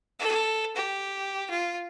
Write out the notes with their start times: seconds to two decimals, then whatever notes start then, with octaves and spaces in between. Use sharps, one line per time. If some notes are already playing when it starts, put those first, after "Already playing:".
0.19 A4
0.76 G4
1.50 F4